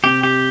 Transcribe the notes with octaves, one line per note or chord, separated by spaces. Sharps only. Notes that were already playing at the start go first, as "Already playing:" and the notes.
C3 G4
G4